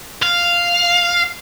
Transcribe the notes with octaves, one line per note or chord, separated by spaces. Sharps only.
F5